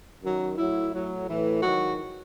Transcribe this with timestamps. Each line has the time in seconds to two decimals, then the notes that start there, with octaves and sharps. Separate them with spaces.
0.22 F#2 D#3 F#3
0.57 A2 F#3 E4
0.92 A2 F#3
1.27 A2 E3
1.62 G#2 D#3 F#3 F#4